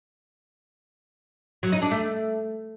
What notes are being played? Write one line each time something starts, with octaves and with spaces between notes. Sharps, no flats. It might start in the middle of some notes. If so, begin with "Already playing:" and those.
F#3
D#4
D4
A3